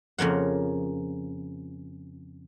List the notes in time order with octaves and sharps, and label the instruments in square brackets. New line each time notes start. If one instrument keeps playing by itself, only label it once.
[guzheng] F2 C#3 A#3 F#5